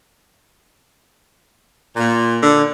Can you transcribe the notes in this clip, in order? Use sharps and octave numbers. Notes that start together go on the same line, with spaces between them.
A#2
D3